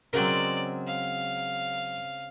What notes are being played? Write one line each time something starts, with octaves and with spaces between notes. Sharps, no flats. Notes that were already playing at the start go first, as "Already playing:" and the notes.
C#3 F#3 G#3 C4 F#4 A#4 D5
F5